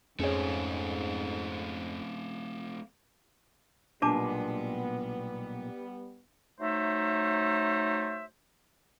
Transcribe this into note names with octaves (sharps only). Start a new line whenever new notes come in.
F2 G#2 A3 C4 C#4 G#4 C#5
B1 A#2 G3 G#3 B3 D4 A5 D6
F#3 A3 D#4 C5 E5